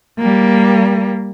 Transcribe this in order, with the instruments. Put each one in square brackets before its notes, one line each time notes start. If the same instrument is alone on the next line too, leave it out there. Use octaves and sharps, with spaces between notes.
[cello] G3 A#3